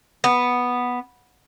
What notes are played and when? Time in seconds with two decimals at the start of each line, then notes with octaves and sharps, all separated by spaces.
0.24 B3